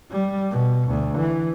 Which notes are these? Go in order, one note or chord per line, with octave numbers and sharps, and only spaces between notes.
G3
B2
D2
E3